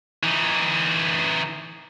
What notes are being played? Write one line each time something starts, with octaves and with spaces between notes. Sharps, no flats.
E3 D#4